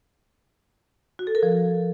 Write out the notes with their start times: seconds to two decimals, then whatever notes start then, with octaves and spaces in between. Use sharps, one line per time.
1.19 F#4
1.27 A4
1.35 A#4
1.43 F3